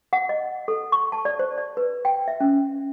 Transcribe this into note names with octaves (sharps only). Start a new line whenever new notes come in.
F#5
D#5
A4
C#6
A5
D5
C5
D5
B4
G5
E5
C#4